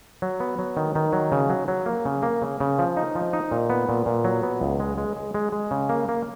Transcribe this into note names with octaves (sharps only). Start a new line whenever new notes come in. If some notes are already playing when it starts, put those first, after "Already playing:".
F#3
B3
F#3
D#3
D#3
F#3
C#3
F#3
F#3
A#3
C#3
A#3
C#3
C#3
F3
D#4
F3
D#4
A#2
B3
A#2
A#2
F#3
B3
C#2
G#3
G#3
G#3
G#3
G#3
C#3
A#3
A#3